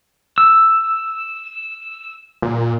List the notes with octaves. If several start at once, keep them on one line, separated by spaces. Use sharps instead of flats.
E6
A#2